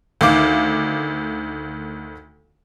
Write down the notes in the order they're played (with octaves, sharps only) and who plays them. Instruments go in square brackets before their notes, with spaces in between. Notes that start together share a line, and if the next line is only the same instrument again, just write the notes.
[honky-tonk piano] D2 D#3 F5 D6